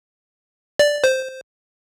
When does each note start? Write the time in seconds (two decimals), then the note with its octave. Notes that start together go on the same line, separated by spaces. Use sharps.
0.79 D5
1.04 C5